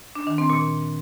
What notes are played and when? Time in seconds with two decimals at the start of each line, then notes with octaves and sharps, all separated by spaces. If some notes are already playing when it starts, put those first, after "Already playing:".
0.15 D4
0.27 D#3
0.38 C4
0.50 A#2